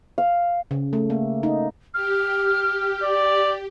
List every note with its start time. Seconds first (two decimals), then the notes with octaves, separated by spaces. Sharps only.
0.18 F5
0.71 C#3
0.93 A3
1.10 A#3
1.43 D#4
1.94 G4 F6
3.04 D5